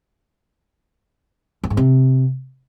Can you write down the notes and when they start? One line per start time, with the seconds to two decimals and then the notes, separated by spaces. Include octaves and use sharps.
1.64 F#2
1.70 G#2
1.77 C3